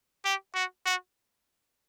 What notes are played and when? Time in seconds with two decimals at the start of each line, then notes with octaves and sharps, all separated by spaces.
0.25 G4
0.55 F#4
0.86 F#4